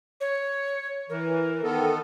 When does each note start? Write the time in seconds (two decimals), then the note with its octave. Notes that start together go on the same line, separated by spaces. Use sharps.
0.20 C#5
1.09 E3 A#4
1.63 D#3 B3 A4